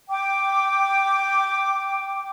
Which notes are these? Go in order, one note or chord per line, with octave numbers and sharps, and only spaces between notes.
G5 D6